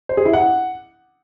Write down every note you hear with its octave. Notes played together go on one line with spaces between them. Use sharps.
C5
G#4
E4
F#5